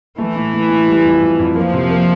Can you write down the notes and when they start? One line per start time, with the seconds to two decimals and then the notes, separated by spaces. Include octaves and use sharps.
0.18 E3 A3
0.36 A2
0.54 A3
0.70 A3
0.87 G3
1.05 F2
1.21 F2
1.39 F2
1.56 F3 A#3
1.74 C3
1.90 A#3